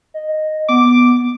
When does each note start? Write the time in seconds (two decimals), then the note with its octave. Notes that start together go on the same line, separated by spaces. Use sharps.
0.14 D#5
0.69 B3 D6